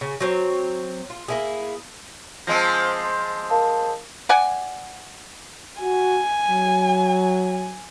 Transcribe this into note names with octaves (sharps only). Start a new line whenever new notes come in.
C#3
F#3 C4 C#5
F4
A#3 E4 G#4
F3 G#3 C4 A#6
A#4 F5 A5
D5 F#5 G#5
F#4 G#5
F#3